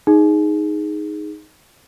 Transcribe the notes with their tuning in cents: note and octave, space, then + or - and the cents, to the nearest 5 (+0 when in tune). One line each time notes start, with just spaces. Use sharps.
D#4 +0 G#4 +0